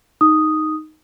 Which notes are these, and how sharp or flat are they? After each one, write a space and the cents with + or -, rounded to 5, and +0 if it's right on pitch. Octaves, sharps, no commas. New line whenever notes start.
D#4 +0 D#6 +0